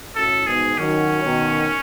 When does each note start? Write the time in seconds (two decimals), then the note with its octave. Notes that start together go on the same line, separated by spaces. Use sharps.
0.16 F#2 A2 A4
0.47 G#2 B2 G#4
0.78 D#3 F#3 C#4
1.24 B2 D#3